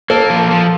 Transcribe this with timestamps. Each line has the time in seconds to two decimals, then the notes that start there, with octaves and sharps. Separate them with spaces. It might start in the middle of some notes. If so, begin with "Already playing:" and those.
0.10 A#3 A4
0.30 F3
0.51 F3